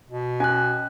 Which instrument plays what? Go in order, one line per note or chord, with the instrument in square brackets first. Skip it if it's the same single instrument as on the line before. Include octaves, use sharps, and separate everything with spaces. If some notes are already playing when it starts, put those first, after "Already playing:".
[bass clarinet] B2
[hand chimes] C#4 F#6 [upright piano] G#5